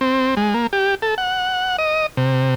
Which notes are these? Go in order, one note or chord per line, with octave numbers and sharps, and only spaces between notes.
C4
G#3
A#3
G4
A4
F#5
D#5
C3